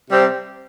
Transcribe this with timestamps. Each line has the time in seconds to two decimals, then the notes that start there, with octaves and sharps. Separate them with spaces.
0.10 C3 G3 C4